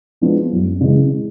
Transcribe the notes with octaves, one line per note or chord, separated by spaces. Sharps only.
F3 G#3 B3 D4
F#2
C#3 E3 G#3